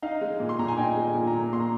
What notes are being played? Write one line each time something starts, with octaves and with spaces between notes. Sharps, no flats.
D#4 F5
G#3
A#2
C6
A#2 A#5
G#5
D#4 G5
G#3
G#5
A#2
A#5
A#2
A#3 C6
A#5